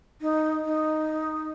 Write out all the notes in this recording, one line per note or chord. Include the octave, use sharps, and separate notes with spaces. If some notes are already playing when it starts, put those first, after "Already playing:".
D#4
D#4